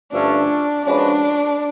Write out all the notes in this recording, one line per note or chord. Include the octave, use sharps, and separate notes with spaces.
G2 D3 F3 A3 C#4 D4
F3 G#3 C#4 D4 F#4 B4